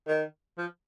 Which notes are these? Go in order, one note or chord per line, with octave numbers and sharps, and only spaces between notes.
D#3
F3